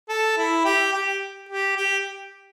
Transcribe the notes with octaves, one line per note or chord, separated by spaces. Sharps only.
A4
E4
G4
G4
G4
G4